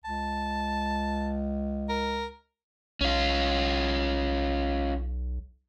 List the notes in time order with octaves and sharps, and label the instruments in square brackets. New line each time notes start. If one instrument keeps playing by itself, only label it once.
[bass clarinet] C#2 [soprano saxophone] A5
[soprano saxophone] A#4
[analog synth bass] B1 [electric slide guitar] C#4 F4